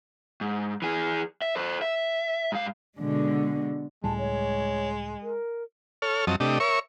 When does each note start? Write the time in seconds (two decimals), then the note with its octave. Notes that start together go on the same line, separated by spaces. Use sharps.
0.41 G#2
0.82 E3 G#4
1.42 E5
1.56 A4 C5
1.82 E5
2.52 G#2 F5
2.98 B2 D3 G#3
4.04 C#2 A2 G3 G#3 A5
4.18 C#5
5.23 A#4
6.02 A4 C#5 F6
6.27 F#2 F3 F#3 C4 D#5 A5
6.40 C3 A3 D4 G4 D#5
6.60 A#4 C#5 E5 C#6